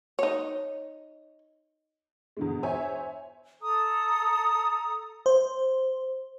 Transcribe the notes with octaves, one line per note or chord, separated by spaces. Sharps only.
D#4 C#5
E2 D3 G#3
C5 C#5 E5 G#5
A4 A#5 D#6
C5